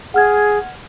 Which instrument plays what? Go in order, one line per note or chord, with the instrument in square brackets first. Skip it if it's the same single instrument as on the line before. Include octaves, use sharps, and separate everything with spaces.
[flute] G#4 [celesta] F#5 F6 G#6